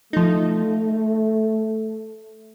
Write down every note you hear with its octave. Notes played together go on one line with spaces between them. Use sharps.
F3 A3 D#4